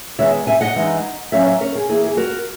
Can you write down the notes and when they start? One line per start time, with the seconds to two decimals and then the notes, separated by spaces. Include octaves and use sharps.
0.19 D#3 G#3 B3 C#5 E5
0.47 E5 G#5
0.61 D#5 F#5
0.76 E3 G#3 D#4
1.32 F#3 A#3 C#4 C#5 E5
1.46 C#5 E5
1.61 A#4 C#5
1.75 G#4
1.89 E3 A#3 E4 G#4
2.06 G#4
2.17 F#4 A#4